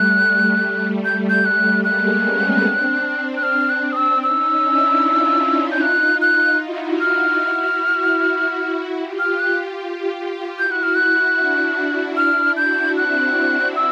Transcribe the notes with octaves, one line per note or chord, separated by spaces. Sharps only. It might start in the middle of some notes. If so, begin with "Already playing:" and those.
Already playing: G3 A3 F#6
G6
G6
F#6
G#3 A#3 F#6
B3 C#4
C4 D4
F#6
F6
F#6
D#6
E6
C#4 D#4 E6
D4 E4
D#4 F4
G6
F#6
F#6
E4 F#4
F6
E4 F#4
F4 G4
F6
F#6
E4 F#4 G6
F#6
F6
F#6
D4 E4
D4 E4 F6
E4 F#4 G6
C4 D4 F#6
E6